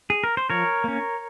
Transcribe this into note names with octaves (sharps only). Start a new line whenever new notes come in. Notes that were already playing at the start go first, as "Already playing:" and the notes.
G#4
A#4
C5
F3 A#4 C#5
A#3 C#4